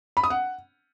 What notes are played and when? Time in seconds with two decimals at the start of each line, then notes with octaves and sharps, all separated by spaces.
0.17 B5
0.24 D#6
0.30 F#5